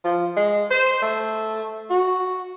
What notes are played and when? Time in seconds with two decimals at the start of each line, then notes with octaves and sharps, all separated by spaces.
0.05 F3
0.37 G#3
0.71 C5
1.02 A3
1.90 F#4